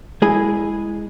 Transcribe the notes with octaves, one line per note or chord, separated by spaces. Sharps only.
G#3 E4 G#4 G#5